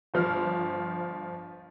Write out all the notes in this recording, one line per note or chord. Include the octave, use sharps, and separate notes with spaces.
G1 F3 F6